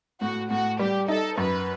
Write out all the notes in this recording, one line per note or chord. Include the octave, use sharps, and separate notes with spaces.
A2 F#4
A2 F#4
G3 G4
D#4 A4
F#2 B4